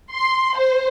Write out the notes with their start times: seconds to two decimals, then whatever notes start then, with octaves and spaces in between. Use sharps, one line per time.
0.13 C6
0.55 C5